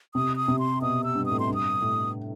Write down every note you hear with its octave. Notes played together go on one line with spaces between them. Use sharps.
C3 D#6
D#6
C3
C6
B2 D#6
E6
G2
D#6
A2
C6
G2
D#6
A2